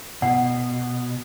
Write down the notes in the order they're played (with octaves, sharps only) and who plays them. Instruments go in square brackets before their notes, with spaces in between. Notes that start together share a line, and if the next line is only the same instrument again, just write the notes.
[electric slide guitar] B2 [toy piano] F#5